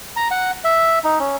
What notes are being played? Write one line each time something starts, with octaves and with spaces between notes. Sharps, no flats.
A#5
F#5
E5
D#4
C#4